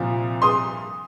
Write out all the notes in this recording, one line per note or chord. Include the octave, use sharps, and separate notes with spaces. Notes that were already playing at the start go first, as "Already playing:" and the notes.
Already playing: C2 A#2 F3
C6 D#6